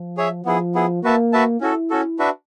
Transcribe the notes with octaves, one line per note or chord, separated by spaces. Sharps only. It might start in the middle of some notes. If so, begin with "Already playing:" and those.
Already playing: F3
G#4 C#5 E5
F3 B3 E4 G#4
B3 E4 G#4
A#3 F#4 B4 E5 A5
F#4 B4 E5 A5
C#4 E4 F#4 A4
C#4 F#4 A4
D4 F#4 B4 E5